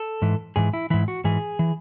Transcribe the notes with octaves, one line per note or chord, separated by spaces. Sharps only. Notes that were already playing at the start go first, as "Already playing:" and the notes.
Already playing: A4
G#2 E3
G#2 E3 G#4
E4
G#2 E3 E4
F#4
G#2 E3 G#4
E3